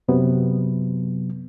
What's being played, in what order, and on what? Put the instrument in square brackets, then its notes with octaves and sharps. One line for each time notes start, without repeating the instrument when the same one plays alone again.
[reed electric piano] F#2 C3 F#3 B3